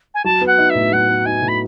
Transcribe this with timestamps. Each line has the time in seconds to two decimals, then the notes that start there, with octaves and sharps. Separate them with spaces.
0.14 G#5
0.24 F#3 A5
0.41 B3
0.46 F#5
0.58 D#4
0.69 E5
0.75 A2
0.92 F#3 F#5
1.09 B3
1.25 D#4 G#5
1.42 A2
1.48 B5